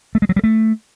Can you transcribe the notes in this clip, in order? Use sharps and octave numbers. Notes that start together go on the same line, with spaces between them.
A3
G#3
F#3
G3
A3